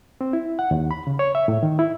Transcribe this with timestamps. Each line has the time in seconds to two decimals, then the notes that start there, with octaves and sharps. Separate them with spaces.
0.21 C4
0.33 E4
0.59 F#5
0.71 D#2
0.91 B5
1.07 C#3
1.19 C#5
1.35 E5
1.48 A2
1.63 D#3
1.79 E4